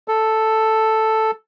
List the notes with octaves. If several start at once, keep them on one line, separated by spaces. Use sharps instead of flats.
A4